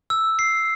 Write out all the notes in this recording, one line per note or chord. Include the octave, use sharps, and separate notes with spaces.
E6
C7